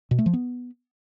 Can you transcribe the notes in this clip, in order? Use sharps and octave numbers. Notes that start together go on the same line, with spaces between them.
B2
A3
F3
B3